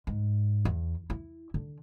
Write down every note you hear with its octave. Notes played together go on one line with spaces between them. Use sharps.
G#2
E2
E4
D3